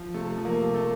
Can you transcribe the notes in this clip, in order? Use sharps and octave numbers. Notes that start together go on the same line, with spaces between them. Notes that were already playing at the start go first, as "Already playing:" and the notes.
Already playing: F3
C3 A3
F3
A#3
C3
A3